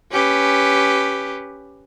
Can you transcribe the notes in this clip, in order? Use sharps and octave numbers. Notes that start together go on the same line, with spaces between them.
C#4 G4 B4